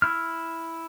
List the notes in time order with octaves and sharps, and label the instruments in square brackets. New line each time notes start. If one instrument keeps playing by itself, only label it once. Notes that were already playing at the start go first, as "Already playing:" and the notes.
[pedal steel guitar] E4 F6